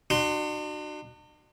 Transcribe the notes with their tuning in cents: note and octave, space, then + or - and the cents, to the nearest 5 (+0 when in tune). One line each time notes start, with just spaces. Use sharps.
D4 +45 F#4 +10 C6 +0